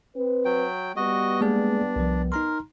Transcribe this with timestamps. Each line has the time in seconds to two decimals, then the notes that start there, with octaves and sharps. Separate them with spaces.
0.16 C4 B4
0.45 F#3 G5
0.96 G3 B3 F#4 D#5
1.41 G#3 A#3 D4 G#4
1.96 C2 F3
2.32 D#4 A#4 A#5 C6